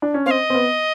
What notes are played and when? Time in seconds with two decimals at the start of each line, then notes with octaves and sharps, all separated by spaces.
0.02 D4
0.14 C#4
0.26 C4 F5
0.31 D#5
0.50 C4
0.55 B3